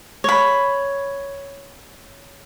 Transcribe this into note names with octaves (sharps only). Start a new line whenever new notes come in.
C#5 B5